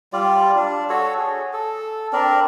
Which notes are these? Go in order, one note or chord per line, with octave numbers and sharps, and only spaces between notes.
G3 F4 D5
D4
F#4 A4 C#5
G#4
A4
C4 D4 A#4 D5